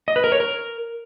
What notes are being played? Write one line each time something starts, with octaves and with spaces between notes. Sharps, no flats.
D#5
B4
A#4
C#5
A#4